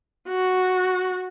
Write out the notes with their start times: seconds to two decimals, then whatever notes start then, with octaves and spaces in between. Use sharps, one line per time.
0.28 F#4